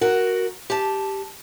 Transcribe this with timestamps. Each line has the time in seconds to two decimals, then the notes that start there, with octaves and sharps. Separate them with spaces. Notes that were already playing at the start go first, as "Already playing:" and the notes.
0.01 F#4 A#4
0.70 G4 A5